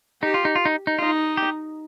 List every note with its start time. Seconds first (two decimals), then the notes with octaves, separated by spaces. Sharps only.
0.22 D#4 G4
0.34 F4
0.45 D#4
0.56 F4
0.65 D#4
0.87 D#4
0.99 D#4 F4
1.37 G4